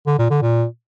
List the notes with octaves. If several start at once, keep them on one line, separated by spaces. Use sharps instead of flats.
D3
A#2
D3
A#2